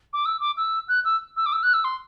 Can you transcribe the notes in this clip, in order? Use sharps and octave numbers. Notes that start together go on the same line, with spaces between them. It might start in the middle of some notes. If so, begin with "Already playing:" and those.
D6
E6
D6
E6
F#6
E6
E6
D6
E6
F#6
E6
C6